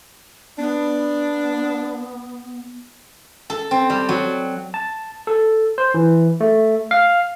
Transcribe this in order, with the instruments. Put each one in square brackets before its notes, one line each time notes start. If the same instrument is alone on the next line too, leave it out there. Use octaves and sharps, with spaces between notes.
[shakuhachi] B3 [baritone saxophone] D4
[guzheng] A4
C4
G3
F#3
[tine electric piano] A5
A4
C5
E3
A3
F5